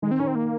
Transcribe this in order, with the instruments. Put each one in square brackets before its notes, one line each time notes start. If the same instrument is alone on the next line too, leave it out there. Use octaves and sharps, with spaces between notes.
[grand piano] D#3 [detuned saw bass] G#3
[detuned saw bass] C4
[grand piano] D#3 [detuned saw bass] C#4
[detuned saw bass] C4
A#3